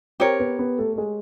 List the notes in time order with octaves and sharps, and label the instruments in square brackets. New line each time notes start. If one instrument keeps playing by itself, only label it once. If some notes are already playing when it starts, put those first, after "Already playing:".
[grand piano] C4 C5 [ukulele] G4 A#4 C#5
[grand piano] B3 B4
B3 B4
A3 A4
A4
G#3 G#4